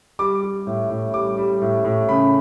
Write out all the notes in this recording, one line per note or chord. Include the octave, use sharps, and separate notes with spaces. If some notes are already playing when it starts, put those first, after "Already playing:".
G3 D6
G3
A2
A2
G3 D6
G3
A2
A2
C#3 B5